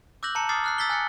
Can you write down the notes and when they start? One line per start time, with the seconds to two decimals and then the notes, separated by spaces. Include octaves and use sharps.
0.23 D6 E6 F#6 G6 A#6 F#7
0.35 A5 A#5 C#7
0.49 D6 D#6 F6 A6 C7
0.64 F6 F#6 C7
0.78 E6 A6 B6 C7 G7
0.89 G#5 F#6 A6 C#7